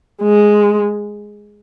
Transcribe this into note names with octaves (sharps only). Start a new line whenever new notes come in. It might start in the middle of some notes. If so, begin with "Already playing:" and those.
G#3